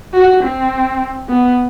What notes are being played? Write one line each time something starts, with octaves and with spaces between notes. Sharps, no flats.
F#4
C4
B3